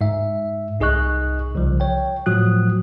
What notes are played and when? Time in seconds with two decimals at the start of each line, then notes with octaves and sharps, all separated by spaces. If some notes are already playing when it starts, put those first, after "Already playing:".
0.01 G#2 E5
0.80 C2 D#4 G#4 D#5 C#6 F#6
1.54 C2 C#3 F3
1.80 C#5 G5
2.26 A2 F3 F#3 F#4 D#6 F#6